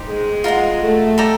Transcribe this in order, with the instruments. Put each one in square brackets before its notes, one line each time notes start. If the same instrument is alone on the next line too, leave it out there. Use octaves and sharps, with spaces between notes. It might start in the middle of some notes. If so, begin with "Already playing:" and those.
Already playing: [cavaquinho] D#4 G4 C5
[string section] G#3
[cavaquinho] F4 A#4 D#5 F#5
[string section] A3
[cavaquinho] A4 D5 G5 A#5